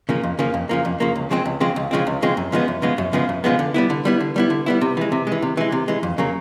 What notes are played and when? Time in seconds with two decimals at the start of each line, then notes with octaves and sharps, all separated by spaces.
0.09 C#3 F3 A#3
0.23 F2
0.39 C#3 F3 A#3
0.54 F2
0.69 C#3 F3 A#3
0.85 F2
1.00 C#3 F3 A#3
1.15 C#2
1.30 C#3 F3 G#3 C4
1.46 C#2
1.60 C#3 F3 G#3 C4
1.76 C#2
1.91 C#3 F3 G#3 C4
2.07 C#2
2.22 C#3 F3 G#3 C4
2.37 F#2
2.52 C#3 F3 G#3 B3
2.68 F#2
2.82 C#3 F3 G#3 B3
2.98 F#2
3.13 C#3 F3 G#3 B3
3.29 F#2
3.44 C#3 F3 G#3 B3
3.59 D3
3.74 G3 B3 E4
3.90 D3
4.05 G3 B3 E4
4.21 D3
4.36 G3 B3 E4
4.50 D3
4.66 G3 B3 E4
4.81 C3
4.97 E3 G#3
5.12 C3
5.27 E3 G#3
5.42 C3
5.57 E3 G#3
5.72 C3
5.88 E3 G#3
6.03 F2
6.18 C#3 F#3 A#3